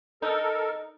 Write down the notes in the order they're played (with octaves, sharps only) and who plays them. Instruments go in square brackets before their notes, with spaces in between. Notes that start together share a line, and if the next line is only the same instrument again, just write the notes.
[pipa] D#4 [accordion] A4 A#4